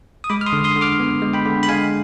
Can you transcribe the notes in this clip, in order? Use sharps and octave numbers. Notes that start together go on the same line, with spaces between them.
D#6
G#3 B5 D6
F6
C6 D#6
D3
C6 D#6
D3
D6 F6
B3
G#3
G5 B5
D3
B5
G#3 F5 G#5